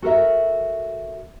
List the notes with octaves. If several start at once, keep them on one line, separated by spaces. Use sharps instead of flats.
F#4 A4 A#4 E5